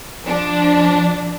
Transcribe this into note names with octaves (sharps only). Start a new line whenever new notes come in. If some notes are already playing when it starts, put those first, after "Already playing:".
F3 D4